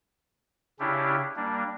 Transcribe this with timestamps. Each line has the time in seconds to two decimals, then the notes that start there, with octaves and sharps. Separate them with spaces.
0.80 C#3 C#4 D4 E4 G4
1.36 G3 A#3 D4